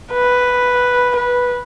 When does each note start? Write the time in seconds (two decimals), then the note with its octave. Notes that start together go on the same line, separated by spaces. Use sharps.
0.12 B4
1.15 B4